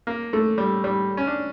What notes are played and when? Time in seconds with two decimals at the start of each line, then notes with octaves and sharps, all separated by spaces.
0.07 A#3
0.33 A3
0.58 G3
0.84 G3
1.17 C#4
1.27 D4